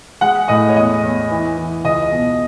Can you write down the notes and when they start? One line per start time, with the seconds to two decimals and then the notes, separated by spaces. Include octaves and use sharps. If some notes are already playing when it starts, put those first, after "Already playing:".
0.21 G#3 F#5
0.48 A2 D#5
0.69 C#5
0.75 E2 D#5
1.03 E2
1.30 E3
1.57 E3
1.84 C#2 D#5
2.11 B2